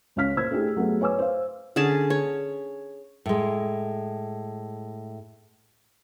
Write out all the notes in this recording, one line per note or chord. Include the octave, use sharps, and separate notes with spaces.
C#2 C#4 C#5 F5 F6 B6
A#2 C5 E6 G#6
A3 D4 E4 G4 G#4
F#3 A3 B3 G#4
B4 C#5 G#5 D6 E6
C5 F5
D3 C#4 G#4 A5
C#5
A2 G#3